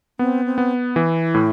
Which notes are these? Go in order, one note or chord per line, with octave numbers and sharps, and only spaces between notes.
B3 C4
C4
B3
E3 E4
A2